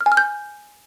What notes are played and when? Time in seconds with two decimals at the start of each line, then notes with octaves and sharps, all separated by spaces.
0.01 F6
0.06 G#5
0.12 F6
0.17 G6